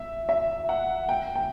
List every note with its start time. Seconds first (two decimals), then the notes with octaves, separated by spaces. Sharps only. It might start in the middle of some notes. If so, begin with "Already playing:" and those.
Already playing: E5
0.29 E5
0.69 F#5
1.09 G5
1.36 G5